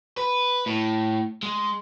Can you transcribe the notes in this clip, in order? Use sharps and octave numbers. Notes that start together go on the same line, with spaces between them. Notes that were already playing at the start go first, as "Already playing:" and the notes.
B4
A2
G#3